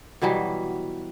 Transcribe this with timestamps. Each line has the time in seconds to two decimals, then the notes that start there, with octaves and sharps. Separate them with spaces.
0.22 B2 E3 F#3 G3